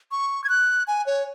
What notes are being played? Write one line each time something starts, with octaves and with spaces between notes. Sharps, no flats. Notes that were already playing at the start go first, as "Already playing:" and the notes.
C#6
G#6
F#6
G#5
C#5